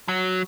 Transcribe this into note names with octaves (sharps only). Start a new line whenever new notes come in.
F#3